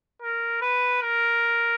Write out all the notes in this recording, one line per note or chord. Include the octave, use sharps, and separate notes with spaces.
A#4
B4
A#4